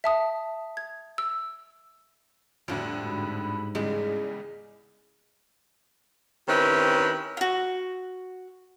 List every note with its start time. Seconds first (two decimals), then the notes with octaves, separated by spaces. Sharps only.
0.04 E5 A5 D#6
0.77 G#6
1.18 E6
2.68 F2 A2 D3 G3 F#4
3.05 G#2 B5
3.75 E2 C#3 G3 G#3 G#4
6.49 D#3 C4 C#4 E4 G4 B4
7.37 F4 F#4